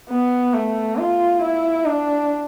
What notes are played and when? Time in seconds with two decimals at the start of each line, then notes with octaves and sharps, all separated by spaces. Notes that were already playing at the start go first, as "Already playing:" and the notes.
0.10 B3
0.54 A3
0.97 F4
1.41 E4
1.85 D4